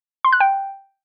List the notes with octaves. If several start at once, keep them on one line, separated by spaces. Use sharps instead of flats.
C6
F#6
G5